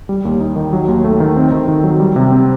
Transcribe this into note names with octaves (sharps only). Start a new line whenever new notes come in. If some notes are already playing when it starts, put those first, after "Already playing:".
G3
D#2
D#4
D#3
F#3
D#2
A3
D#3
C4
D#3
D#3
F#3
G3
C3
C4